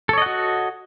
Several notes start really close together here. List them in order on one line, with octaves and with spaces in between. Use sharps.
A4 C#5 D#5 F#5 F#4